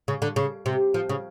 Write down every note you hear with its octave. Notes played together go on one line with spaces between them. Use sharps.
C#3
D3
C#3
C3
F3
C#3